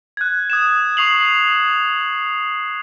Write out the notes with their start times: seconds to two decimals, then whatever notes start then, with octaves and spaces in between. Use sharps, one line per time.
0.17 F#6 G#6
0.50 D#6 G#6 E7
0.97 C#6 D#6 C7 F7 F#7